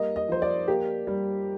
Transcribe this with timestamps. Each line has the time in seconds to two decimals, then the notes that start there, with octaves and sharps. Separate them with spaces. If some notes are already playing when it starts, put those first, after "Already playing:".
Already playing: G3 A#3 D#5
0.16 D#5
0.28 F3 C5
0.42 D5
0.68 A#3 G4
1.07 G3